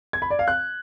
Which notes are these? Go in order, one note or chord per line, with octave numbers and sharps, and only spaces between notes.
G#6
B5
D5
F5
F#6